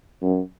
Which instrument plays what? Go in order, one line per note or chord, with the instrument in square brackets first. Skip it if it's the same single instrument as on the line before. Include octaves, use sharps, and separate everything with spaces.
[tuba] F#2